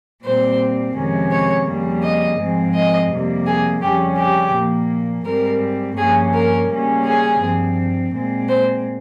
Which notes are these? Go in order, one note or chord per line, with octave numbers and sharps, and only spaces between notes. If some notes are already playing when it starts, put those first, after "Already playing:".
A#2 G3 C4 C5
F2 C3 D#3 G#3 C#4
C#5
F2 C#3 G3 A#3
D#5
G#2 F3 G#3 C4
D#5
F2 C3 G3 A#3
G#4
F2 C#3 G3 C#4 G4
G4
A#2 F3 A#3
G#2 G3 C4 A#4
G2 F3 A#3 C#4 G#4
A#4
C#3 G3 A#3 C#4
G#4
G2 F3 C4
A#2 G#3 C4
C5